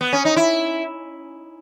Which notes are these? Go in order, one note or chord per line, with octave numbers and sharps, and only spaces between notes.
B3
C#4
D#4
E4